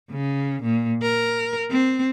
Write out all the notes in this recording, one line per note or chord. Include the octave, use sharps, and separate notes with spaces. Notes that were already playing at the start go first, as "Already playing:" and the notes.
C#3
A#2
A#4
C4